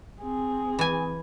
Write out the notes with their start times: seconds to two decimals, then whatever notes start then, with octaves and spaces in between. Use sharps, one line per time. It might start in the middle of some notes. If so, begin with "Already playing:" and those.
0.21 C4 G#4
0.79 E3 G#5